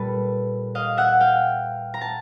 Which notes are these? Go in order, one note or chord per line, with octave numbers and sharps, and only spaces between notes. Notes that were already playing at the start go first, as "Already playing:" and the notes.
Already playing: A#2 G3 A4 B4
D#5 F5
E5 F#5
F5 G5
A#5
A5